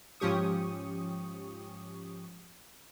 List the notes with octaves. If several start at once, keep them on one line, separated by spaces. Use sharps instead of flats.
G#2 F3 C#4 G4 C#6 D#6